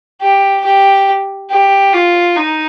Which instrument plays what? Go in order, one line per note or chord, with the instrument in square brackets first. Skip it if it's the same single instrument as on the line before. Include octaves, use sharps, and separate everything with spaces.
[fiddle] G4
G4
G4
F4
D#4